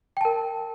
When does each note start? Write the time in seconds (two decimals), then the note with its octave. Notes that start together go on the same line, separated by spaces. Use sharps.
0.17 G5
0.21 A5
0.25 A#4